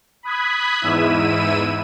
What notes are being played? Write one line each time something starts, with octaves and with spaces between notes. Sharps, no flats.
B5 D#6 F#6 G#6 B6
E2 G#2 E4 E6 D#7